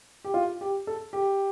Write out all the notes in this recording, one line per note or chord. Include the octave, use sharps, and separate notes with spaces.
G4
F4
G4
A4
G4